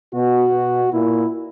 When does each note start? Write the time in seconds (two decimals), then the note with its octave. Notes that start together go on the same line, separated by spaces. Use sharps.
0.13 B2 F#4
0.53 B2
0.92 A#2 E4